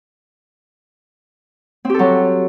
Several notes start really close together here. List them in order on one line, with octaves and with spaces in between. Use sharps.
C4 G4 A4 F#3